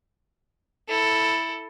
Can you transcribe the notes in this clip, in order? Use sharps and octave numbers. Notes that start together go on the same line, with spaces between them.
E4 A4